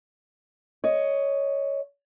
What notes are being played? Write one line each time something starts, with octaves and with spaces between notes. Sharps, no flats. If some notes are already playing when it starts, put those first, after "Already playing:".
C#5 D#5